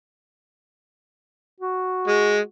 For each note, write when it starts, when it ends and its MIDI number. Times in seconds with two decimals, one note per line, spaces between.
1.60 2.49 66
2.07 2.38 56